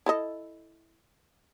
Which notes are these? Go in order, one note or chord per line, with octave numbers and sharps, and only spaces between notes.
E4 A4 D#5